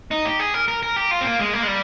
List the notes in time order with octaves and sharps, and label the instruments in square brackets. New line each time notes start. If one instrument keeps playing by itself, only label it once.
[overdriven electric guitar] D#4
G4
G#4
A#4
A#4
A#4
G4
F4
C4
A#3
G#3
A#3
G#3
G3